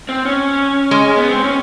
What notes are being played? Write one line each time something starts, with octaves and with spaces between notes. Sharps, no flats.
C4
C#4
G#3
B3
C4
C#4